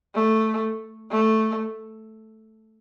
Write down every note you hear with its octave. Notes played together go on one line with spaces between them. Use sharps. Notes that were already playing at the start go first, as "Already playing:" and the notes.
A3
A3